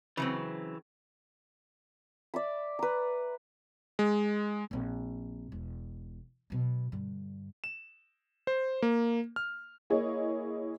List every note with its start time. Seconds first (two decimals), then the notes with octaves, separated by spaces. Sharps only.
0.17 C#3 E3 F#3 C4
2.34 D5 E5 B5
2.79 B4 A#5
3.99 G#3
4.71 A#1 C4
5.52 E1
6.50 B2 F#3
6.92 G2 D3
7.64 E7
8.47 C5
8.82 A#3
9.36 F6
9.90 A#3 E4 G#4 C#5 D#5